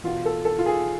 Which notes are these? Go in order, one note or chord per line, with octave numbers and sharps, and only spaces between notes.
E2 B2 F4
A4
A4
F4
G#4